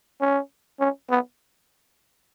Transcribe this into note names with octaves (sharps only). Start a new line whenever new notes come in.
C#4
C#4
B3